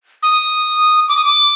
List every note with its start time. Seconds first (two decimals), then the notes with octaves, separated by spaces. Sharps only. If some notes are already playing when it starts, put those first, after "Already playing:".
0.23 D#6
1.09 D6
1.17 D#6
1.24 D6